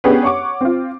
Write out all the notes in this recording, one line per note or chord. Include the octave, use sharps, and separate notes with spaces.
B3 C#4 D4 G4 G#4 B4
C#5 F#5 C#6 D6
C4 F4